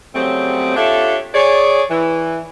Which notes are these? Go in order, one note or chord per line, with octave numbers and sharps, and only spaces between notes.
C#3 F#3 G3 A3 C4
D4 F4 G4 A4 C#5 E5
G#4 C#5 D5
E3